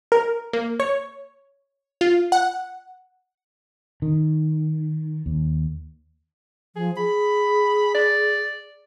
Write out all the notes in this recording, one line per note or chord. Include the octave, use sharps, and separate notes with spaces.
A#4
A#3
C#5
F4
F#5
D#3
D#2
F3 G#4
G#4 B5
D5